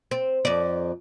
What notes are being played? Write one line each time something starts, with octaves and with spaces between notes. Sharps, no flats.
C4
F2 D5